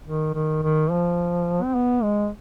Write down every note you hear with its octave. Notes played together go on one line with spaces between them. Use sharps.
D#3
D#3
D#3
F3
C4
B3
G#3